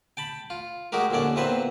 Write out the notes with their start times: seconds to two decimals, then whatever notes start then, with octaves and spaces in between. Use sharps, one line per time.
0.17 G5 A5 B5
0.50 F4
0.92 F#3 G#3 F#4 G4 A#4
1.11 A#1 D#2 D3 C#4 D5
1.36 E2 A#2 C4 B4 C5 E5